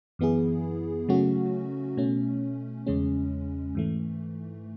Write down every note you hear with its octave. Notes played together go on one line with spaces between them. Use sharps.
F#2 E3 B3 E4 G#4
C#3 F#3 A3 C#4 F#4
B2 A3 C#4
E2 C#3 G#3 C#4
G#2 E3 A3